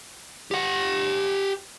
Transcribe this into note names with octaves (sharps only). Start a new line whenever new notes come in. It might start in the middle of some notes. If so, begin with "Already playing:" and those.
G4 F#5